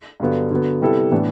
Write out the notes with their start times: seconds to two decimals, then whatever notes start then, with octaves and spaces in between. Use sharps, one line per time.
0.20 G2 D3 F#3 B3
0.51 D3 F#3 B3
0.82 C3 G3 B3 E4 A4
1.11 A2 E3 B3 D4